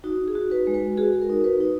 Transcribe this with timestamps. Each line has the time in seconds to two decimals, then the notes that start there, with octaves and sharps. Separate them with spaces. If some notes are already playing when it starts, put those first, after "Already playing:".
0.04 D#4 F#4
0.28 G#4
0.35 F#4
0.51 B4
0.67 G#3
0.74 B4
0.97 F#4 G#4
1.22 A#4
1.30 D#4
1.44 B4
1.60 D#4